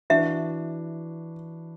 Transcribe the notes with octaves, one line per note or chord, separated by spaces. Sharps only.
E3 D4 F#4 E5